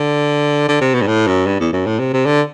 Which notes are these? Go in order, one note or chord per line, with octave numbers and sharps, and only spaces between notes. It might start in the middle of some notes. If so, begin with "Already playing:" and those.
Already playing: D3
D3
C3
B2
G2
A2
F#2
G2
E2
F#2
A2
C3
C3
D3